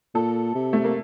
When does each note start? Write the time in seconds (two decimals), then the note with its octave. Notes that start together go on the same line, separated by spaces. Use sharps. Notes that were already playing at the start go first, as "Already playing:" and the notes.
0.15 A#2 A4
0.55 C3
0.73 A3
0.84 A#3